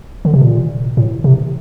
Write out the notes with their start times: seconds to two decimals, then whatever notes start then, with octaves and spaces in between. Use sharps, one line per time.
0.25 D3
0.34 C3
0.42 A#2
0.97 A2
1.24 C3